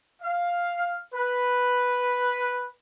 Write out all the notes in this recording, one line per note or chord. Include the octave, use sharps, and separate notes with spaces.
F5
B4